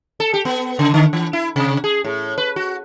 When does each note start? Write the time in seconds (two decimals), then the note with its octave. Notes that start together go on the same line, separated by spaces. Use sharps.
0.20 A4
0.34 G4
0.45 B3
0.79 C#3
0.94 D3
1.13 E3
1.33 E4
1.56 C3
1.84 G#4
2.04 A2
2.38 B4
2.56 F#4